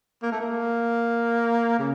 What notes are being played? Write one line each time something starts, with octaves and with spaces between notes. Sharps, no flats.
A#3
A3
A#3
C#3